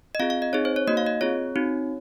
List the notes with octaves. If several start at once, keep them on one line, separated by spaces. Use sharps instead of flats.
D#5
C4 F4 G#4 F5
F5
D#5
C4 D#4 G#4 C#5
C5
C#5
A#3 D#4 F#4 D#5
F5
D#5
C4 F4 G#4 C#5
C4 D#4 F#4